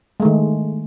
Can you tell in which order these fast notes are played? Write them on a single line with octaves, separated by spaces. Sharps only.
G#3 A3 D#3